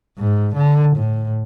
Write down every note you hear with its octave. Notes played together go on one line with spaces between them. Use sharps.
G#2
D3
A2